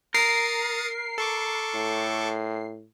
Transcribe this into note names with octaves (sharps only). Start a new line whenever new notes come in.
A#4 D#6 A6 C7 C#7
A4 C#6 D6
A2